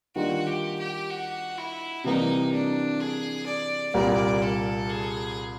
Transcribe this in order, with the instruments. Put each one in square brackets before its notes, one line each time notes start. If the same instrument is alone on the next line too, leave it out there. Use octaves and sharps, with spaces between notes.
[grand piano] D#3 G3 A#3 D4 F4 [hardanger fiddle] F#4
[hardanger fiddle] G4
G4
F#4
E4
[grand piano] C3 E3 G3 A#3 [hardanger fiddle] D#4
[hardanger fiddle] D4
G#4
D5
[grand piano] C2 A#2 G3 A#3 [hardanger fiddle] D5
[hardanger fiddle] A4
G#4